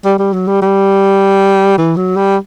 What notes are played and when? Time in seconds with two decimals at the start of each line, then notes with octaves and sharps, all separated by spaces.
0.05 G3
0.19 G3
0.33 F#3
0.48 G3
0.62 G3
1.78 E3
1.97 F#3
2.17 G3